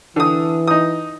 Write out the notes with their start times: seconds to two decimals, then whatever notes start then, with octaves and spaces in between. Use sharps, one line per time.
0.16 D3 E3 D#6
0.68 D#4 D#6